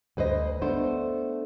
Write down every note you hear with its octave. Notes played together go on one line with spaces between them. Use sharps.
D2 B4 C5 D#5
A3 B3 D4 C5